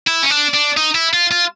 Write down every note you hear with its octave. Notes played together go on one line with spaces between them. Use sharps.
E4
C#4
D4
D4
D#4
E4
F4
F4